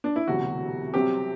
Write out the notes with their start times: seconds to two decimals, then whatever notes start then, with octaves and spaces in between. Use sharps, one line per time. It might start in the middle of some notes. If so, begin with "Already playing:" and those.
0.04 D4
0.16 E4
0.27 E1 D2 C3 F#3 F#4
0.94 C2 C3 F#3 C4 G4